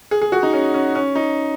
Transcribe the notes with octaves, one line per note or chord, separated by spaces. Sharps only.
G#4
G#4
F#4
D#4
C#4
C#4
C#4
D#4